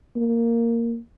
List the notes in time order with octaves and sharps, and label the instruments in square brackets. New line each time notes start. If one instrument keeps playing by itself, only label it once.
[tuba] A#3